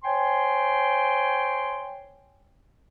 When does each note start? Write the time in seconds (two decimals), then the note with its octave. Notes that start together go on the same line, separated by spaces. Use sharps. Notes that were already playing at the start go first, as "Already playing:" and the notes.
0.03 C5 C#5 G5 G#5 C6